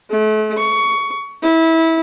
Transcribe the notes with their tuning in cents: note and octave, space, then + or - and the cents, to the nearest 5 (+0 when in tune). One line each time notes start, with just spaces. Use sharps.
A3 -35
C#6 +20
E4 -20